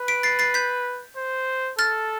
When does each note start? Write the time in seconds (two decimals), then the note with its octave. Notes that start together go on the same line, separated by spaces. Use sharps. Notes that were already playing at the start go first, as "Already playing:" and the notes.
Already playing: B4
0.08 B6 D7
0.23 A6 C7
0.39 A6 C7
0.54 G6 B6
1.17 C5
1.78 A4 F6 A6